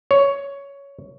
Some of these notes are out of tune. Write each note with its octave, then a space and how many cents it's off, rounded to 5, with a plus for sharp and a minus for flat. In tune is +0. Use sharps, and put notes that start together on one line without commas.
C#5 +10